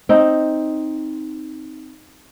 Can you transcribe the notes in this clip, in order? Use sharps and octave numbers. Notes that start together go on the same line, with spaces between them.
C4 D#4